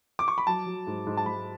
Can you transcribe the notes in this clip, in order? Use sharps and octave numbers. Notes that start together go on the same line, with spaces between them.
D6
C#6
B5
F#3 A5
F#3
G#2
G#2
A5
G#2 B5